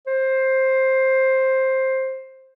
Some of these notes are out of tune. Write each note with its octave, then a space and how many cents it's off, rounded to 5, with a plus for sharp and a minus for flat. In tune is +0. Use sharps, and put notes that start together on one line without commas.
C5 +10